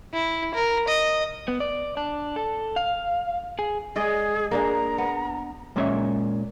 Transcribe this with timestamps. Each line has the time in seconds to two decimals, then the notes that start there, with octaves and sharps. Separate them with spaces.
0.13 E4
0.54 A#4
0.88 D#5
1.48 B3
1.60 D5
1.97 D4
2.36 A4
2.76 F5
3.59 G#4
3.96 G#3 G#4 D5 D#5
4.51 A#3 D4 G#4 A#5
4.98 B3
5.76 A#2 G#3 A#3 C#4 E5